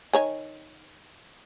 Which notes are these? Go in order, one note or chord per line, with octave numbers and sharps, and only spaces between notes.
D#3 C#5 G#5